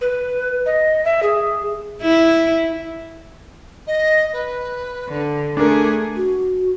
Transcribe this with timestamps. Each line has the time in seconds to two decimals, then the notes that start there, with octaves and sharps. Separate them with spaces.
0.01 B4
0.66 D#5
1.05 E5
1.23 G#4
2.02 E4
3.87 D#5
4.33 B4
5.09 D3
5.57 A3 D4 G#4 A#4 D6
6.16 F#4